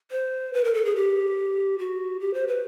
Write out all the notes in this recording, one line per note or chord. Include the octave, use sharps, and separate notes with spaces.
C5
B4
A#4
A4
G#4
G4
F#4
G4
C5
B4